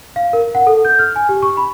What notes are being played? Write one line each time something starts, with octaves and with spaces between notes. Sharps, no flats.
F5
A#4
F#5
A4
G6
F6
G#5
G4
C#6
B5